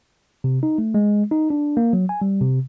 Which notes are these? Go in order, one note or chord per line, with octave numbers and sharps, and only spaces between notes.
C3
D#4
A3
G#3
D#4
D4
A#3
F#3
G#5
G3
C3